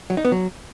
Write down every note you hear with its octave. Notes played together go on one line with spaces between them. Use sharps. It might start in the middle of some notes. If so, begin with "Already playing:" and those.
F#3
D#4
B3
F#3